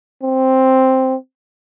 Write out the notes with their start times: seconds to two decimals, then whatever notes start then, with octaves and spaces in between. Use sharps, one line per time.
0.23 C4